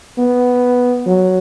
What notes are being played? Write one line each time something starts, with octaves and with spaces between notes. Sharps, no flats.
B3
F#3